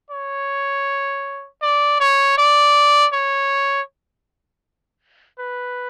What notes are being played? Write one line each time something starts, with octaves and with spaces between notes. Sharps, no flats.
C#5
D5
C#5
D5
C#5
B4